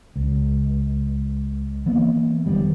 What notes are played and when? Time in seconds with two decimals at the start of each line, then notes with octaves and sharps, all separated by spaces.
0.16 C#2
1.86 E3 A#3 B3
2.46 F#1 F2 D#3 G3